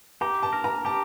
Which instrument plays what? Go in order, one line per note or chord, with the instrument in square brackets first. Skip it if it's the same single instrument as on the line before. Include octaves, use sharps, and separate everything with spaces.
[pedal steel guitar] G4 [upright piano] A#5
[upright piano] A5
[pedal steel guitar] A#4
[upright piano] A#5
[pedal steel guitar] G4 [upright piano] A5